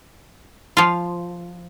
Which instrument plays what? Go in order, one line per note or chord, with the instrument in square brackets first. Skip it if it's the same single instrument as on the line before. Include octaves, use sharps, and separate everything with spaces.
[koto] F3 F4